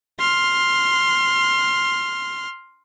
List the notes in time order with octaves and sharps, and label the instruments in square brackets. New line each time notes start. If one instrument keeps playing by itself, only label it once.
[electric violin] C6 F6